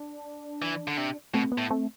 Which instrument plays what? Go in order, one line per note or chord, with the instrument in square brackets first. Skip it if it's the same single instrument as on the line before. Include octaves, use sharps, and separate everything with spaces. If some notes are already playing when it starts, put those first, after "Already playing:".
Already playing: [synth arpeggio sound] D4
[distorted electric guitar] E3
D3
C3
[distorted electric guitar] B2 [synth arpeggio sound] A3 C4
[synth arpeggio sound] B3
[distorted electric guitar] A2
[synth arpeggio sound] A3 C4